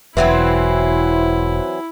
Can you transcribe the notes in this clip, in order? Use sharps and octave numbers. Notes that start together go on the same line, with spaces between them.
E1 E3 F#3 C4 E4